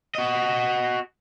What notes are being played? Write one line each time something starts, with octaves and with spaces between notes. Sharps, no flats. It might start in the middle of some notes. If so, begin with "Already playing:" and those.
F#4 D#5